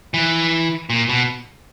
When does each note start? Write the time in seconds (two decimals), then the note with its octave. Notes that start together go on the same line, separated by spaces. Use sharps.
0.14 E3
0.90 A#2
1.09 B2